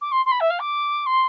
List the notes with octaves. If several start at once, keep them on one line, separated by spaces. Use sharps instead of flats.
D6
C6
C6
B5
E5
F5
D6
C6